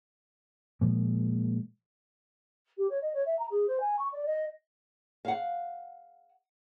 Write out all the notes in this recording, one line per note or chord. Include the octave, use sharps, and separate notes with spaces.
A#2 F3 G#3 A#3
G4
C#5
D#5
C#5
E5
A#5
G#4
C5
G#5
C#6
D5
D#5
F5 F#5